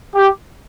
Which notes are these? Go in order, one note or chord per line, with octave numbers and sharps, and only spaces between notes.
G4